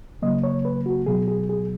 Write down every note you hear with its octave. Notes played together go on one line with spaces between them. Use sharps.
C#3 F#3 A#3 D#5
C#5
B4
F#4
B2 F#3 B3 G#4
G#4
G#4